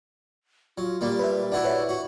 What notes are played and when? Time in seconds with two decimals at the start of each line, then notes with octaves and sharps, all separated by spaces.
0.78 F#3 F4
1.01 A#2 G3 A#3
1.19 B4 E5
1.52 D4 E4 F#4 F#5
1.64 B4 C#5 E5
1.89 F#4